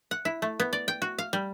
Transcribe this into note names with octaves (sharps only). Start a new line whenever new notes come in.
F#5
E4
A3
B3
D5
G5
F#4
F5
G3